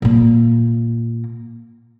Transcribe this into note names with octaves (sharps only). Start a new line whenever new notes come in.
A#2 A#3